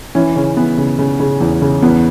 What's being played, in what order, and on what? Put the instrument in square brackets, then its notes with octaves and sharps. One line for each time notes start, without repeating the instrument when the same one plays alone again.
[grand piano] E3 C#4
C#3 C#4
E3 B3
C#3
C#3
C#3
E2
C#3
E2 B3